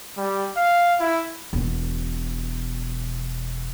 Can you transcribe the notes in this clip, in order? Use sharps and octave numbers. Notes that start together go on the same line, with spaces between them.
G3
F5
E4
E1 B2